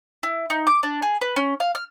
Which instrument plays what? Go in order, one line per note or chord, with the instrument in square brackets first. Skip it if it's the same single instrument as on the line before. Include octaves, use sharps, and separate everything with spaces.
[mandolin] E4
D#4
D6
D4
G#4
B4
C#4
F5
F6